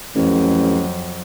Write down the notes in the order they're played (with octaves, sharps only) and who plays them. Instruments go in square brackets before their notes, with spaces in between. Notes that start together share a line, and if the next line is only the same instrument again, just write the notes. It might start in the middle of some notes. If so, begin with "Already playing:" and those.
[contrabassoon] A1 [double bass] F2 F#3